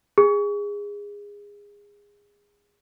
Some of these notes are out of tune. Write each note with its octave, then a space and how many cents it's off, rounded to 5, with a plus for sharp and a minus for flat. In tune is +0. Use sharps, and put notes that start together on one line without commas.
G#4 -20